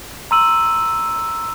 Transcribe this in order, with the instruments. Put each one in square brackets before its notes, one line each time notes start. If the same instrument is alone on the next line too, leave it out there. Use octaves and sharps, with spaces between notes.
[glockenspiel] A#5 C6 E6 D#7 F#7